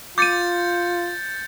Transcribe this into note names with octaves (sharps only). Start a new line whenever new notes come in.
F4 D6 G6 A6 C#7 D#7